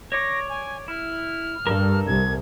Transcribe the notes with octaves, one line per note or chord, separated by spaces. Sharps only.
C#5 D5 C#6 A#6
G#5
E4 F6
G2 A4 A#4
C2 G#6